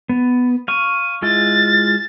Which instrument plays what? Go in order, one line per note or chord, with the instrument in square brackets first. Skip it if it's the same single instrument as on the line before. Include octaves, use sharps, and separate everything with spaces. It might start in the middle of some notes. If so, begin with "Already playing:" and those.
[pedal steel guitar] B3
[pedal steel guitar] F5 C#6 [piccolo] D#7
[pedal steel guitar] G#3 E4 F4 [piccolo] A6